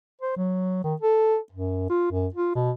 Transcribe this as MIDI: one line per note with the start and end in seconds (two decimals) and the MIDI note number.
0.22 0.34 72
0.37 0.84 54
0.84 0.95 51
1.02 1.37 69
1.52 1.86 42
1.90 2.10 65
2.12 2.27 42
2.34 2.54 65
2.55 2.71 47